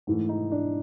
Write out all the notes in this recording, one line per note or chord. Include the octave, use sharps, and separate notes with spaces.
G#2 E3 A3
D#4
D4